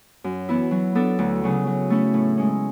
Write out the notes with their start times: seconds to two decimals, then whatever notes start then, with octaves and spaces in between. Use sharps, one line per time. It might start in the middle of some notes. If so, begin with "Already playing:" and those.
0.24 F#2
0.49 E3 B3 E4
0.71 F#3
0.95 B3 D4 A4
1.19 D2
1.44 C#3 F#3
1.67 F#3
1.90 A3 C#4 E4
2.14 A2
2.37 G#3 C#4